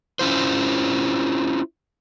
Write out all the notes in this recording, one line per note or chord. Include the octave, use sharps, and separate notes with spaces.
C#4 E4 F4 C5